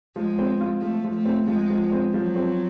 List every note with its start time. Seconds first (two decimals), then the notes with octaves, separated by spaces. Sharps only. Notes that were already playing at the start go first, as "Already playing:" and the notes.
0.16 F3 G#3
0.39 C4
0.61 F4
0.82 F3 A3
1.04 F3
1.14 A3
1.26 C4
1.48 F3 G#3
1.70 F3
1.92 C4
2.14 F3 F#3
2.36 C4